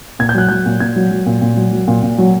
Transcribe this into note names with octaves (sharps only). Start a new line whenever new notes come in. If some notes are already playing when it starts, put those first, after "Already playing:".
A#2 G#6
G6
F#3 F#6
F#3 G6
A#2
A#2 G#6
F#3
F#3
A#2
A#2
F#3
F#3
A#2
A#2
F#3